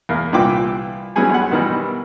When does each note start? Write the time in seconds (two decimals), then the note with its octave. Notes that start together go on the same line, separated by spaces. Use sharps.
0.09 E2 A#3
0.32 C2 A#2 E3 G5 D6
1.16 E3 F#3 G3 C#4 G#4 G#5
1.30 B1 F#5
1.51 B2 D#3 E3 G3